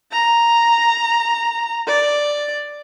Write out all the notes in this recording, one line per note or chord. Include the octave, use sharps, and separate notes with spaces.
A#5
D5